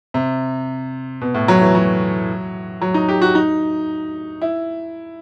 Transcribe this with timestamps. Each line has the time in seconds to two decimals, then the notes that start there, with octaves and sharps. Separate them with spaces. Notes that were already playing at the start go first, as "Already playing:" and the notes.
0.14 C3
1.21 B2
1.34 A2
1.48 F#3
1.61 E3
1.75 F#3
2.81 F#3
2.94 D#4
3.09 G4
3.22 F#4
3.35 D#4
4.42 E4